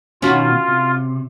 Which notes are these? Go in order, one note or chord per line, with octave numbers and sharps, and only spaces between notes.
B2 D#3 C#4 F4 F#4
C3